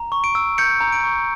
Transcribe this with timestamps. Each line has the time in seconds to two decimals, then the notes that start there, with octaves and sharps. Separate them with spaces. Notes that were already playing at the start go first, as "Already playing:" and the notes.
Already playing: A#5
0.12 C#6
0.24 D7
0.35 E6
0.58 G6 C#7
0.81 A#5
0.92 D7
1.04 C#6